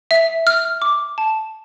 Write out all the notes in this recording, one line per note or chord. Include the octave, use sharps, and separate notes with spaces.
E5
F6
D6
A5